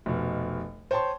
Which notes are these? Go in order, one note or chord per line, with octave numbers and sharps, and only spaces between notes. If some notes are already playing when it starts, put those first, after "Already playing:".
F1 B2
C5 C#5 G5 A5 C6